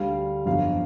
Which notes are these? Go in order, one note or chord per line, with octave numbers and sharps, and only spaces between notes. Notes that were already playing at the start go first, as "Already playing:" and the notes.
Already playing: D2 D3 G3 F5
G1 F2 D3 F#3 F5